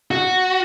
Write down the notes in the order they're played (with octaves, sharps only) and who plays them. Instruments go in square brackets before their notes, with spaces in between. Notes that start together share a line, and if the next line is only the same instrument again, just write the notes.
[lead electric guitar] F#4